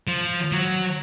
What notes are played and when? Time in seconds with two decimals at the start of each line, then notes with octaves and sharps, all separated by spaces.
0.07 F3
0.52 F#3